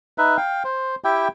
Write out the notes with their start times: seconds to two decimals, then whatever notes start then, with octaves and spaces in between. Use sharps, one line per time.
0.18 D#4 B4 E5
0.37 F5 G5
0.64 C5
1.04 E4 G4 E5 G5